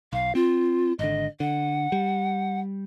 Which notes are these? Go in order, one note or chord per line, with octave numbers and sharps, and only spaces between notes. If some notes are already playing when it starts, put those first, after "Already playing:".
B1 F5
C4 F4
G#1 D3 D#5
D3 F#5
G3